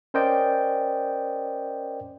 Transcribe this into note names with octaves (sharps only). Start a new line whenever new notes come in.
C#4 A#4 C5 D5 D#5 G5